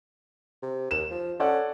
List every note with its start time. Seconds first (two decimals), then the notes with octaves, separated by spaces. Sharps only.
0.63 C3
0.91 D#2 E7
1.11 F3
1.40 C#4 A4 D5 F#5